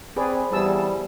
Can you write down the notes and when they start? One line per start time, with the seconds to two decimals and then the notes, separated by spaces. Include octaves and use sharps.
0.17 C4 G#4 B4 C5 D5 B5
0.52 E2 G3 G#4 A5 E6